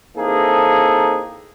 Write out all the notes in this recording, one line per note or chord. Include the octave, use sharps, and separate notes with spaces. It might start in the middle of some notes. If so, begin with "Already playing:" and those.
E3 A#3 C4 D#4 G#4 A4